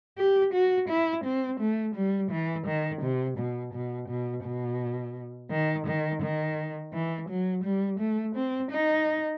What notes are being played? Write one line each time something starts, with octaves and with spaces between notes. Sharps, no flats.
G4
F#4
E4
C4
A3
G3
E3
D#3
C3
B2
B2
B2
B2
D#3
D#3
D#3
E3
F#3
G3
A3
C4
D#4